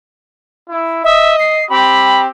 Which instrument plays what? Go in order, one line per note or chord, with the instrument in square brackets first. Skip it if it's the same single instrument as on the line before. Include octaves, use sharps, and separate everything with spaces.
[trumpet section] E4
[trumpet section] D#5 [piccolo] E5
[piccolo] C7
[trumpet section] C4 G4 [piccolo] B5